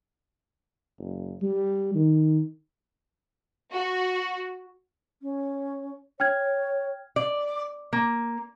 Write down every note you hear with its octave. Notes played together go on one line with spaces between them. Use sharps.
F#1
G3
D#3
F#4
C#4
C#5 G5 F6 G#6
D5
A#3